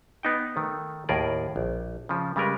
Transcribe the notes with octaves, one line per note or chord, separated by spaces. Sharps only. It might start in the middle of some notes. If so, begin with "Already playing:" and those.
B3 D#4 G5
D#3 A3
D#2 A2 G#4 A#4 D5
A#1
C#3 F3
C#3 G3 G#3 A#4 B4